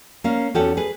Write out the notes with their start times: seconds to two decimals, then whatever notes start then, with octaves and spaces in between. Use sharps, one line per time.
0.24 A#3 C#4 F5
0.54 E2 C#4 F#4 G4 A4 F#5
0.77 G#4 B4